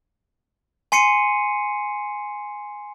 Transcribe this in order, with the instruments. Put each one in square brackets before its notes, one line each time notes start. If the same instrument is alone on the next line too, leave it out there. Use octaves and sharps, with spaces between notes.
[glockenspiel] G#5 C6 C7 C#7 D#7